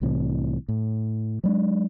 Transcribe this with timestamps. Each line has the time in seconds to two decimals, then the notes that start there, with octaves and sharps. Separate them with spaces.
0.01 C2 A2 C3 E3
0.69 A2
1.44 F#3 G#3 D4